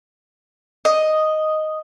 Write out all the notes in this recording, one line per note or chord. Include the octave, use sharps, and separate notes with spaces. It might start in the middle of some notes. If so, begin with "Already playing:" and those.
D#5